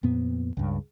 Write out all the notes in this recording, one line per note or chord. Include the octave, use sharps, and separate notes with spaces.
F2 A#2 B3
C#2 G2